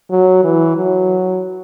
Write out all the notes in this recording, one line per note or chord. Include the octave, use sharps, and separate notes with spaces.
F#3
E3
F#3